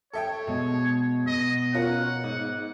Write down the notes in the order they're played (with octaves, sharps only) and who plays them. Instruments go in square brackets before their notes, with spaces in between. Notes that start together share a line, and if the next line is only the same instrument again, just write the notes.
[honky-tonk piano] A4 E5 G5 [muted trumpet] C#5
[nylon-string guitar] B2 [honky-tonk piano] G#3
[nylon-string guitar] B2 [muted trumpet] D#5
[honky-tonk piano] C#4 F4 A#4 [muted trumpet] F#5
[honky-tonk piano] G#2